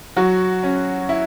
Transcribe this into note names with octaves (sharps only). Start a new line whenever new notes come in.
F#3 F#4
C#4
E4